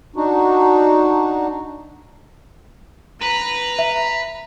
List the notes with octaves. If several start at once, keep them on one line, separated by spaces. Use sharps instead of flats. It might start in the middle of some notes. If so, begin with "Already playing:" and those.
D4 D#4 F#4
B4 A#5
E5